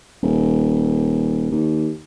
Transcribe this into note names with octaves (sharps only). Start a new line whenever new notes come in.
D#1
D#2